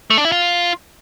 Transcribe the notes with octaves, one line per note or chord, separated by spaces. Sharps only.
A3
D4
E4
F4